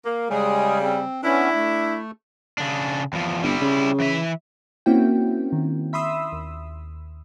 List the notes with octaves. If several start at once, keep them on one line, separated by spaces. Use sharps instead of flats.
A#3
C#3 G3 G#3 G#4
C4
B3 C#4 D4 E4
A3
C#3 D4
E2 F3
G1 G3 E4
C#3
E3 E5
A#3 C4 C#4 E4 F#4 G5
D#3
E5 B5 C6 D#6 E6
D#2